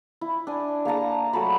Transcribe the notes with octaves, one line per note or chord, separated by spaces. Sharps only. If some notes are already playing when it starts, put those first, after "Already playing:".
E4
D4 G#5
A#3 G#4 A5 A#5
F#3 A3 A5 B5